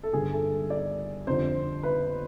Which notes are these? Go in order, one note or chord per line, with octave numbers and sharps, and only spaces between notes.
A4
G2 D3 G3 G#4
A4
A4
D5
F2 D3 G3 C5
B4